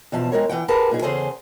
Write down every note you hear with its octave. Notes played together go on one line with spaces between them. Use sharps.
E2 B2 F3 A5
F2 G#3 A#4 C#5
E3 A3 F#5 G5
G4 G#4 A#4 B4 F#5 A5
F#2 A#2 D#4 G#4
E2 C#3 G#4 A4 C5 G#5